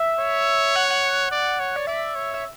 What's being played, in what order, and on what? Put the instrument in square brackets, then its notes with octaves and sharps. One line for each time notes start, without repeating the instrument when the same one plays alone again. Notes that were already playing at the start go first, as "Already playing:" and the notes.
Already playing: [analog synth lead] E5
[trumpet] C#5
[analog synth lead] F#5
F#5
[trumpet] D5
C#5
[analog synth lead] D5
[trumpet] D5 [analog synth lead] E5
[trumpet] C#5
[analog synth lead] E5